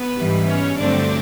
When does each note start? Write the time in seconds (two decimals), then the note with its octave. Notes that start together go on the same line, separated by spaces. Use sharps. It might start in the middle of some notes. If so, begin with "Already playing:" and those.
Already playing: B3 B4
0.18 G#2 E3 G3
0.47 C#4 C#5
0.77 G2 D3 F#3 A3 C4 D4 D5